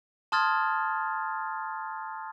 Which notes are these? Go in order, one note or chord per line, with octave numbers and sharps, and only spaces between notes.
A5 C6 D#6 F6 G#6 A6